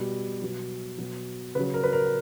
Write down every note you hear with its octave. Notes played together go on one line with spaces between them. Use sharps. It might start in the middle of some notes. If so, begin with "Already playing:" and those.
Already playing: B2 G3
B2 F#3
B2 F#3
C#3 F#3 B4
A#4
B4
A#4